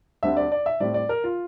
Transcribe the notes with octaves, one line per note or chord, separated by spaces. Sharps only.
D2 D3 G3 C4 E5
D5
D5
E5
A2 G3 C4 D5
D5
A#4
F4